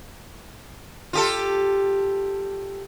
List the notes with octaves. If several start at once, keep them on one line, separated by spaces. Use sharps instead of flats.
F4 G4 A4